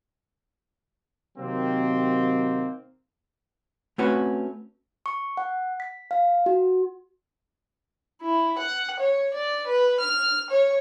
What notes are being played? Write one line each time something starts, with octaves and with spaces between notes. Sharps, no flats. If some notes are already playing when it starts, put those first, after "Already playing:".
C3 D#3 F#3 A#3 C4
A3 C4 C#4 F#4 B4 F#5
C#6
F#5
B6
F5
F#4
E4
F#5
C#5
D5
B4
F6
C#5